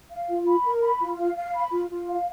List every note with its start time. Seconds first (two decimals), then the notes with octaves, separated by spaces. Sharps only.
0.11 F5
0.29 F4
0.46 B5
0.65 A#4
0.82 B5
1.01 F4
1.19 F5
1.37 F5
1.55 B5
1.72 F4
1.90 F4
2.09 F5